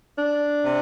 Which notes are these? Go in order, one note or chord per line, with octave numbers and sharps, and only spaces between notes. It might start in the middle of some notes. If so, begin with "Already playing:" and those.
D4
C3